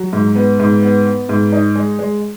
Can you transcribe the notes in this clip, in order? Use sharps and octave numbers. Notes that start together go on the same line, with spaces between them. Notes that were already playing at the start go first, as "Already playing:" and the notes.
Already playing: F#3
G#2
B3
G#2
B3
B3
G#2
D#4
G#3
G#3